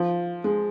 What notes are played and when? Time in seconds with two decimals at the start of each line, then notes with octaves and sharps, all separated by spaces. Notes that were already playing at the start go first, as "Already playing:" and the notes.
Already playing: F3
0.44 G#3